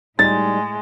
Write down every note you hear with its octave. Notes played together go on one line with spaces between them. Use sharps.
A2 G3 G#3 D#4 A6